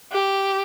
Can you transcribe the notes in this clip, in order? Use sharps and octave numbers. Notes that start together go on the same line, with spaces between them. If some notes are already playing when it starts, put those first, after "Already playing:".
G4